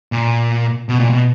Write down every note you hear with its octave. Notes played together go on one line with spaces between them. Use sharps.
A#2
B2
A#2
B2